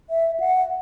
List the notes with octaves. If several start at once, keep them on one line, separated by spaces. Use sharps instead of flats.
E5
F#5